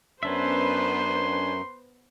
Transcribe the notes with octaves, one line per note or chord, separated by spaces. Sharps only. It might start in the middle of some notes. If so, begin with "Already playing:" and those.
F#2 B3 C#4 D4 B4 C5 E5 C6